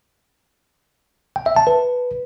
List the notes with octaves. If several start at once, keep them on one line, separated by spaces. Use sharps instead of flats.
G5
E5
A5
B4